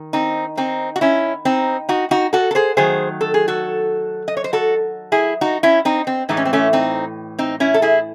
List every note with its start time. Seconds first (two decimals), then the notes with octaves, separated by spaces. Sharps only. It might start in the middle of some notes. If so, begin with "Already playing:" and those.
Already playing: D#3
0.13 C4 D#4
0.57 C4 D#4
0.96 F#4
1.01 C#4 E4
1.45 C4 D#4
1.89 D#4 F#4
2.11 D#4 F#4
2.33 F#4 A4
2.51 A4
2.55 G#4 C5
2.77 D#3 F#3 A3 G#4 C5
3.21 A4
3.34 G#4
3.48 F#4 A4
4.28 D#5
4.37 C#5
4.44 C5
4.53 F#4 A4
5.12 E4 G#4
5.41 D#4 F#4
5.63 C#4 E4
5.85 C4 D#4
6.07 C4
6.29 A2 E3 G#3 D#4
6.37 C#4
6.45 C4
6.53 A3 C#4
6.73 C4 D#4
7.39 C4 D#4
7.60 C#4 E4
7.74 A4
7.82 E4 G#4